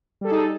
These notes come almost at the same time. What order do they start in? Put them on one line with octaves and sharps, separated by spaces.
G3 A4 G#4 D#4